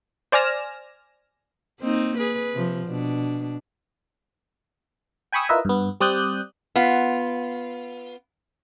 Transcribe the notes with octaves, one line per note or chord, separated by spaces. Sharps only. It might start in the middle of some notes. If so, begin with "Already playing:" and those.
C5 D5 G#5 F6 A#6 E7
A#3 C4 D#4
G#4 B4
C3 F3
B2 D4
G5 G#5 B5 C#6 D#6 E6
E4 F4 A#4 B4 D#5 E5
G2 B3
G3 C4 D5 D#6 F#6 G6
B3 F4